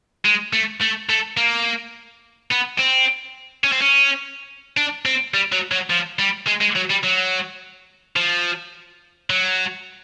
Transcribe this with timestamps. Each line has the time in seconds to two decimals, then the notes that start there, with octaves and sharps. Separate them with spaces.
0.25 G#3
0.53 A3
0.81 A3
1.09 A3
1.37 A#3
2.51 B3
2.79 C4
3.64 C#4
3.72 C4
3.81 C#4
4.77 D4
5.05 C4
5.34 G3
5.52 F#3
5.72 F#3
5.90 F3
6.19 G3
6.47 G#3
6.61 G#3
6.75 F#3
6.90 G3
7.03 F#3
8.16 F3
9.30 F#3